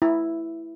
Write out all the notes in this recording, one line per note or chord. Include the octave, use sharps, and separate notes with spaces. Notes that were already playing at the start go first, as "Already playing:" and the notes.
E4